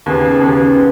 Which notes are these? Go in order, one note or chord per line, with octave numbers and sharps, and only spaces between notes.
D#2 C#3 B3 G#4
D#2 C#3 B3 G#4
C#3 B3